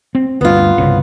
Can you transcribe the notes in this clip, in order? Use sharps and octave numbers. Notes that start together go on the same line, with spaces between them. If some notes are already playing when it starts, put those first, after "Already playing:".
C4
D2 G2 B3 F4
G1 C2 C#3